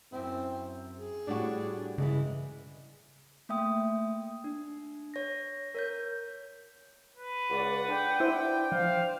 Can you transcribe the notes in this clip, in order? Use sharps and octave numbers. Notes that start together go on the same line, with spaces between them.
F#2 C4 E4
G#4
A2 G3 D4 F#4
G2 C#3 E3 G#3
A3 A#3 E5 G5 D#6
D4
C#5 A#6
A#4 C#5 G6
B4
C#2 D5 F#5
D4 G5
E4 C5
F3 C5 F5